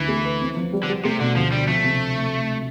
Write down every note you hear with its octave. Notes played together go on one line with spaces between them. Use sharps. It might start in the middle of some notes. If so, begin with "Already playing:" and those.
Already playing: D2 E3
A3
B4
C4
F3
G3
D3
G3
C3 A3
B2 D3
D2 F3
D3 G3
F3 A3
C3